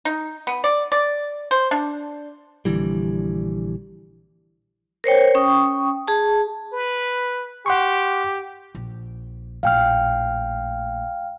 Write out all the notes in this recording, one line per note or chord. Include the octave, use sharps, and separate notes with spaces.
D#4
B3
D5
D5
C5
D4
A#1 D3 E3 G3
A#4 C5 C#5 G5
C#4 G5 C#6 D#6
G#4 A5
B4
G4 F#5 C6 C#6
A#1
A#1 A2 F5 G5 F6